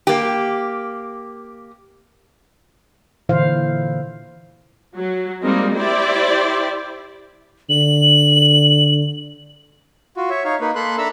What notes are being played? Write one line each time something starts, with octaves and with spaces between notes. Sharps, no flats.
A#3 G4
A#2 D3 E3 E4 C5 F5
F#3
G3 G#3 A#3 C4 D#4
E4 G4 C5 D5 G5
D3 F#7
F4 F#4
C#5 E5
D#4 C#5 F5
A#3 D#4 B4
A#3 A4 B5 C6 F#6
D4 A4 E5 A#5 B5 E6